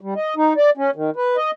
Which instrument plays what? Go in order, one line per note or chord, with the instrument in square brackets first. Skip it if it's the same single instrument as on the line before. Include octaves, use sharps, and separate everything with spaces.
[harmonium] G3
D#5
D#4
D5
C#4
D#3
B4
D#5